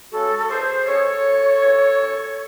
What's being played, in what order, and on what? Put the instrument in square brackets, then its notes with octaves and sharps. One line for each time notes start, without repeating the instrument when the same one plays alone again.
[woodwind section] C#3 G#3 F#4 A4
A4
E2 G#4 C5
C#3 G#3 A4 C#5
F#2
C#3 E3
F#2